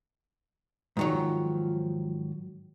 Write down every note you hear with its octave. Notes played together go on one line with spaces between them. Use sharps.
G#2 D#3 F3 F#3